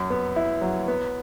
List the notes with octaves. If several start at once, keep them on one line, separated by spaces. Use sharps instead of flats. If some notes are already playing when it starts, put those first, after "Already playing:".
Already playing: F#2
B3
E4
F#3
B3